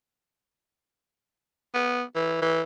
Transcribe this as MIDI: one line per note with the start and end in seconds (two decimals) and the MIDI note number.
1.74 2.03 59
2.15 2.39 52
2.42 2.62 52